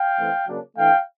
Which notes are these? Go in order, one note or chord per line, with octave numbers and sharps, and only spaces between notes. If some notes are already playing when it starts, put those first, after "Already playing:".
Already playing: F5 G5
E3 A3 C4
C#3 F#3 A#3 D4
E3 A3 D4 F5 G5